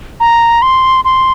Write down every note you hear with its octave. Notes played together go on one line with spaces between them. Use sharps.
A#5
C6
C6